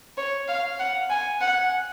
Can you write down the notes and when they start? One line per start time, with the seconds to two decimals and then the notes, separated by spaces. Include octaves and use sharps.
0.18 C#5
0.48 F5
0.79 F#5
1.10 G#5
1.41 F#5